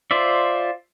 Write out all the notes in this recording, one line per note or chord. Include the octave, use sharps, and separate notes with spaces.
F4 C5 D5 E5